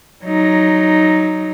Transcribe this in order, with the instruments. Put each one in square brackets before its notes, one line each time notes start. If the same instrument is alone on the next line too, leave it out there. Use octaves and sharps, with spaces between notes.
[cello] F#3 D#4